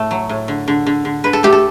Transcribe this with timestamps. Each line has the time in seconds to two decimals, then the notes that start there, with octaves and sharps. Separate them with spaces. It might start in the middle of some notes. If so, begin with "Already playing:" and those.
Already playing: A2 A3
0.11 F#3
0.29 A2
0.48 D3
0.68 D3
0.87 D3
1.05 D3
1.24 D3 B4
1.33 A4
1.43 A3 G4
1.53 A4